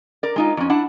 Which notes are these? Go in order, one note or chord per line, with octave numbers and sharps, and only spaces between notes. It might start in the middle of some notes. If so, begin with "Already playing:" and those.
A#4 D5
G#3 D#4 F4
F2 C#4
D4 E4 F#5 A5